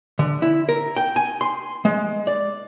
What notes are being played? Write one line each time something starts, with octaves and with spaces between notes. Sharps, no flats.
D3
E4
A#4
G5
G#5
C6
G#3
D5